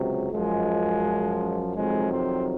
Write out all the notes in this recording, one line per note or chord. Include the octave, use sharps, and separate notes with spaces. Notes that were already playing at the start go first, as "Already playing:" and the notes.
Already playing: C#2 C3 F#3
F#2 F3 G#3
F2 C3 D#3 F#3 G#3
C4